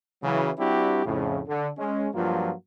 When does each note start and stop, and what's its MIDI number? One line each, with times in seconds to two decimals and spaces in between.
0.23 0.50 49
0.23 0.50 52
0.23 0.50 54
0.58 1.03 55
0.58 1.03 60
0.58 1.03 62
0.58 1.03 64
0.58 1.03 66
0.58 1.03 67
1.05 1.41 41
1.05 1.41 45
1.05 1.41 49
1.47 1.69 50
1.78 2.08 56
1.78 2.08 61
2.14 2.52 43
2.14 2.52 53
2.14 2.52 54
2.14 2.52 58
2.14 2.52 65